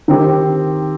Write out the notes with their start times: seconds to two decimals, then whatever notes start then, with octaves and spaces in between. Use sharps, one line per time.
0.08 D#3 C4 G4 C5